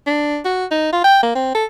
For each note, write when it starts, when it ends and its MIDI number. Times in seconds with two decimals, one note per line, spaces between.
0.07 0.40 62
0.45 0.65 66
0.71 0.89 63
0.93 1.03 65
1.04 1.18 79
1.23 1.35 58
1.35 1.51 60
1.55 1.65 69